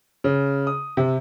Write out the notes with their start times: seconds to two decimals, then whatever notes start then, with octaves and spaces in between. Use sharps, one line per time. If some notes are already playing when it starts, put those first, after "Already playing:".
0.24 C#3
0.67 D#6
0.97 C3